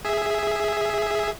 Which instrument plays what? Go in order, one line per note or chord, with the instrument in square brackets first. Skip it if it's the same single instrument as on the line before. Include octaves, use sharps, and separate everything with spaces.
[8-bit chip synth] G#4 E5